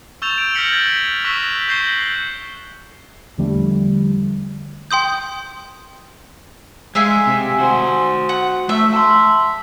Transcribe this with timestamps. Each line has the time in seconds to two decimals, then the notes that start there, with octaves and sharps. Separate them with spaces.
0.22 C#6 E6 G6 A6 E7 F7
0.38 D7
0.54 F6 G6 A#6 B6 C#7 F#7
0.73 G#6 A6
1.24 C#6 E6 F#6 A#6 B6 E7
1.68 C#6 G6 A#6 C7 F#7 G7
3.38 E2 D3 F3 G3 A3
4.91 G5 C6 D#6 G6
6.95 G#3 E5 F5 G#5
7.27 C3
7.59 F#4 C5
8.29 F#5
8.69 A3 E5
8.94 A5 C6